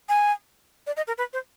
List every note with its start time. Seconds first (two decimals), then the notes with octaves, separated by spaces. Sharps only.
0.09 G#5
0.87 D5
0.97 D#5
1.07 A#4
1.18 B4
1.33 C5